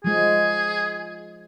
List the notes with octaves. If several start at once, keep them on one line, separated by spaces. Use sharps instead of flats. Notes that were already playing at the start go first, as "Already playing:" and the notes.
F3 G#3 G#4